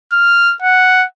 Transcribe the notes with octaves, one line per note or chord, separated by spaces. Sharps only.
F6
F#5